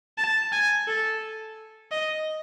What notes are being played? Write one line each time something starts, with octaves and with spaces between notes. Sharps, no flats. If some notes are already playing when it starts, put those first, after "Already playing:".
A5
G#5
A4
D#5